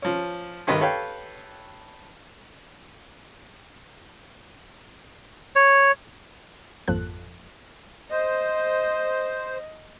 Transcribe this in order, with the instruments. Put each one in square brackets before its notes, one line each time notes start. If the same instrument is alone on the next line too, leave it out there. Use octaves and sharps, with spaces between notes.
[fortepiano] F3 C#4
C2 G2 D#3 B4 D#5
G4 A4 B4 C#5 F5 G5
[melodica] C#5
[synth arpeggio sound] G#1 F2 A#2 F3 A4 F#6
[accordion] C5 [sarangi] D#5